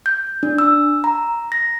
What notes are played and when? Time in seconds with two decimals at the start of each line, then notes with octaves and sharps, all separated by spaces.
0.06 G6
0.43 D4
0.58 E6
1.04 A#5
1.52 A#6